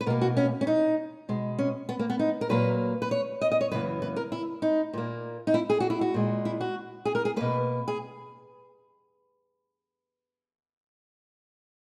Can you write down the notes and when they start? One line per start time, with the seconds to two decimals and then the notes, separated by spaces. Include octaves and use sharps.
0.01 B4
0.06 B2 A#4
0.10 A#3
0.21 F#4
0.37 C#4
0.61 C#4
0.67 D#4
1.29 B2 G#3
1.59 C#4
1.89 B3
1.99 A#3
2.10 B3
2.19 D#4
2.41 A#4
2.49 A#2 F#3 A#3 B4
3.02 B4
3.11 C#5
3.41 D#5
3.52 D#5
3.61 C#5
3.71 F#2 C#3 E3 A#3 B4
4.02 B4
4.16 A#4
4.32 E4
4.62 D#4
4.93 A#2 A#3
5.47 D#4
5.54 E4
5.70 G#4
5.80 F#4
5.90 E4
6.01 F#4
6.14 A#2 G#3
6.45 E4
6.61 F#4
7.05 G#4
7.15 A#4
7.25 G#4
7.36 B2 A#3 B4
7.88 G#4